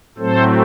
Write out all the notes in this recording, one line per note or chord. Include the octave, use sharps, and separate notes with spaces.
A2 F#3 A3 C4 A4 C5